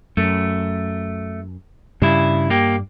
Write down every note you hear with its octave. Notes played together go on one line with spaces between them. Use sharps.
F#2 A3
G2 C#3 G3 E4
A#3 G4